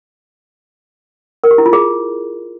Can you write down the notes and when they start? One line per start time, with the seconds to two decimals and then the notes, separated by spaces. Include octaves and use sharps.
1.44 A#4
1.51 G4
1.58 E4
1.66 F4
1.73 G#4